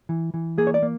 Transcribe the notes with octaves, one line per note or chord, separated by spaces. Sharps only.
E3
E3
A#3 G#4
C#5
D5
A#3